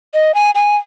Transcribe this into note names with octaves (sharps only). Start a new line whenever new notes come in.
D#5
G#5
G#5